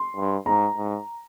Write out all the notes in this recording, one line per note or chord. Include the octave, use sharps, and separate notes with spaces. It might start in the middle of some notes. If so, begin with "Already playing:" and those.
Already playing: C6
G2
G#2 A#5
G#2